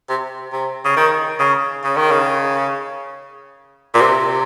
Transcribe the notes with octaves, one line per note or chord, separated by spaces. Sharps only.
C3
C3
C#3
D#3
C#3
C#3
D#3
C#3
A#2
C3